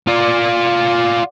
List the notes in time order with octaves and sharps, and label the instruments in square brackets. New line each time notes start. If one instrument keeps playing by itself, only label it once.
[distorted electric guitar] F4 D5